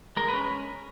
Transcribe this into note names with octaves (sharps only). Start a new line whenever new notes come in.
G#3 A#4
C#4 B4